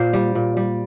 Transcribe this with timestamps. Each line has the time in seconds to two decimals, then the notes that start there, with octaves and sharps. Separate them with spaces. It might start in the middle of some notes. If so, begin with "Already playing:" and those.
Already playing: A#2 C5
0.13 G3
0.35 A#2
0.57 G3